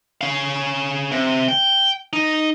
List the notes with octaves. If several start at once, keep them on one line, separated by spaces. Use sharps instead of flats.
C#4 F5
C3
G5
D#4